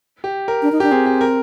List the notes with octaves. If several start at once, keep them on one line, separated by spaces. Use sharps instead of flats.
G4
A#4
D4
D#4
D4 G4
C4 G#4
G4
A#4